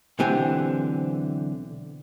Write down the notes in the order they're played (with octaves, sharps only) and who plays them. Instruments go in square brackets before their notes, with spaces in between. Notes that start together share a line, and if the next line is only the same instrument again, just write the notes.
[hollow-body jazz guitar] B1 D3 E3 C4 G4 G#5